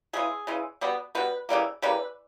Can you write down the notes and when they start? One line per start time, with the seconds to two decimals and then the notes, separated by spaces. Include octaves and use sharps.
0.13 C#3 E3 G#3 G#4
0.47 C#3 E3 G#3
0.81 B2 G3 B3
1.15 B2 G3 B3 B4
1.49 C#3 E3 G3 A#3
1.82 C#3 E3 G3 A#3 B4